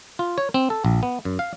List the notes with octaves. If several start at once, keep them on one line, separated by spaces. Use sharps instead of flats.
F4
C#5
C4
A4
A#1
B3
F#2
F5